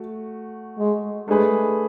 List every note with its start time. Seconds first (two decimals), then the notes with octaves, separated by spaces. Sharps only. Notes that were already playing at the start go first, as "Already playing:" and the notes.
Already playing: A3 F#4
0.78 G#3
1.28 G#3 A3 D4 G#4 B4